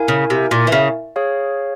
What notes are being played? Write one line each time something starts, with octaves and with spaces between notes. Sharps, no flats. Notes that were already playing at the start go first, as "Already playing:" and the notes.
Already playing: E4 A#4 F5 G#5
C#3
C3
A#2
E3
C#3
G#4 C#5 F5